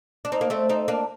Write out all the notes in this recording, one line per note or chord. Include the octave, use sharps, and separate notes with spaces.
D4
C4 D#4
A#3
A3 C4
C4 D#4
A#3 D4